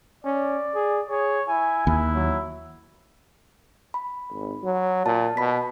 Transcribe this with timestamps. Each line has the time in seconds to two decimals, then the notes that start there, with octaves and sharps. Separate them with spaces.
0.25 C#4 D5
0.75 G#4
1.10 G#4 C#5
1.49 E4 G#5
1.87 D#2 E4
2.15 F#3
3.94 B5
4.31 G#1
4.64 F#3
5.06 A#2 A5
5.37 B2 B5 B6